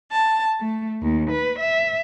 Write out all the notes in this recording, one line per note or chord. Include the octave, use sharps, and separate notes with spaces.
A5
A3
D#2
B4
E5